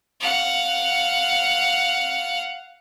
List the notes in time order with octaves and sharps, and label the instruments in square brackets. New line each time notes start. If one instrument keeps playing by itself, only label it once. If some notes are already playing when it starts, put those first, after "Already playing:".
[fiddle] F5 F#5